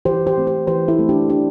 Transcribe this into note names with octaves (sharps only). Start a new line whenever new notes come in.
E3 G4 C5
G4 C5
A3 C4
G4 C5
E3 G4 C5
E4 A4
A3 C4
D4 G4
E3 D4 G4